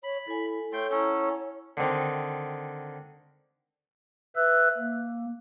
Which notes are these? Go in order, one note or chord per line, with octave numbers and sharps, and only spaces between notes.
C#5 B5
E4 A4 G#5
A3 A4 C#5 G5 C6
C#4 E4 A4 F#5 A#5
D3 D#3 C4 D#4
B4 E5 E6 F#6
A#3